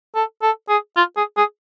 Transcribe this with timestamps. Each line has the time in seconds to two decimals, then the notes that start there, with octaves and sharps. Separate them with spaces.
0.15 A4
0.42 A4
0.69 G#4
0.97 F4
1.17 G#4
1.37 G#4